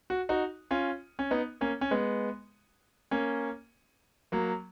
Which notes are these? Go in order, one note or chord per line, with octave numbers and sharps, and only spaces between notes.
F#4
D#4 F#4
C#4 F4
C#4
B3 D#4
A#3 C#4
C#4
G#3 B3
A#3 C#4
F#3 A#3